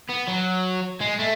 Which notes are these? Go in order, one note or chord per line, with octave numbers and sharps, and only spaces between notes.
B3
F#3
G#3
A3